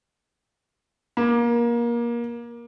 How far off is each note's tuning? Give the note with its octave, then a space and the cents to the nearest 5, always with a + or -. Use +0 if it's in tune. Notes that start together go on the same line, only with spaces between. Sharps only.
A#3 +25